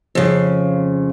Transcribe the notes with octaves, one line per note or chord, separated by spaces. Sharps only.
F2 C#3